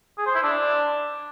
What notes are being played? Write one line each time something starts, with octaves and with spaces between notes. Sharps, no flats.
G#4
C5
E4
D4